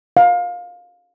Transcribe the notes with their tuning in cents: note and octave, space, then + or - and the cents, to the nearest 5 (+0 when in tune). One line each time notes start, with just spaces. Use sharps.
F5 +20